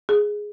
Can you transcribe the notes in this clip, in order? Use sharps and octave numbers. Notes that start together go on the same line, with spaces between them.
G#4